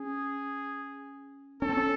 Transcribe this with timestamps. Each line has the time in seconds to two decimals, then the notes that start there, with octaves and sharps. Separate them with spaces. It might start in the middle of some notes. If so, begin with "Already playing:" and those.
Already playing: C#4 G#4
1.62 C#4 A4
1.69 C4
1.77 C#4